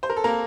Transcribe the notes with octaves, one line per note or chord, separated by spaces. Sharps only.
C5
A#4
A4
A#3 A#4